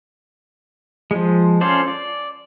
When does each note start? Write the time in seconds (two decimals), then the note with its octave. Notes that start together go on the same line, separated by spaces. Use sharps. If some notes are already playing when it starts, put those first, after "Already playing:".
1.11 F3 G#3
1.61 C#4 F4 A4 C5 D5
1.88 D5